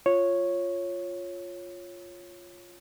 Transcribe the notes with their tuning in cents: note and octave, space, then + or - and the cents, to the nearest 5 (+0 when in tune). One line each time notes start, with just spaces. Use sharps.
F4 +0 C#5 -5